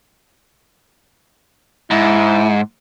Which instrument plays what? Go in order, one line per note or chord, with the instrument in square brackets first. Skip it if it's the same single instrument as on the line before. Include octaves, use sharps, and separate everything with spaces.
[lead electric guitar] G#2 [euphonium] E4